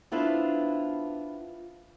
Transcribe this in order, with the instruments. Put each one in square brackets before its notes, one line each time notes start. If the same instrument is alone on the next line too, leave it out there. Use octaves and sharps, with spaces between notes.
[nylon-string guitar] B3 D4 E4 F4 B4 C5